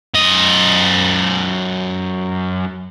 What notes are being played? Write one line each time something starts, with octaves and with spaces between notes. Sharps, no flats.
F#2 D#5